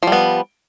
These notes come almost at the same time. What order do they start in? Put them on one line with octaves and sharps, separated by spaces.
F3 G3 B3